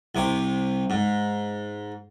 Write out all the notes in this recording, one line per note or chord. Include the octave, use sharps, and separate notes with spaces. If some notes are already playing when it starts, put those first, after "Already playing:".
C2 C3 D6
G#2